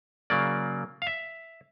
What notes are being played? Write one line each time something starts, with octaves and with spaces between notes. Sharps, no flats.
C#3 F#3 A#3 D5
F5
E5